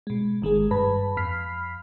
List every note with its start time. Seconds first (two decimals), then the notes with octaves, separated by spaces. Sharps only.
0.07 B2 G#3
0.42 G1 D#3 G#3 G#4
0.71 G2 B4 A5 B5
1.17 F2 B5 F6 B6 C7